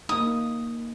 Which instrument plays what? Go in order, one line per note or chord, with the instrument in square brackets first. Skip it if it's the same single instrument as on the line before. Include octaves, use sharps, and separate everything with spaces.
[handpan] A#3 D#4 [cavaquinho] D#6